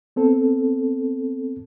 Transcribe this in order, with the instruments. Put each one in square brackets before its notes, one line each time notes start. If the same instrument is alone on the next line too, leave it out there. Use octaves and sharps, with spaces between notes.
[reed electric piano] B3 C4 A4